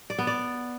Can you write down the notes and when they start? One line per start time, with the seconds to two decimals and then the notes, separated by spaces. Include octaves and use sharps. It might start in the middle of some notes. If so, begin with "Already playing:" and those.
0.10 D5
0.19 B3
0.27 D5